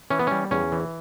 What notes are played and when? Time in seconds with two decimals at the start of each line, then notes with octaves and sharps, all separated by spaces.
0.10 E3 C#4
0.19 B3
0.27 G3 C#4
0.51 E2 C#4
0.72 E3